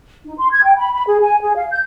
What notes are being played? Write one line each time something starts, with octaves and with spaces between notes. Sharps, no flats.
D#4
C6
G#6
G5
B5
B5
G#4
G#5
G#4
F5
G6